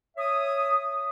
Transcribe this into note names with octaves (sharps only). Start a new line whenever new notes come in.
C#5 E5 D#6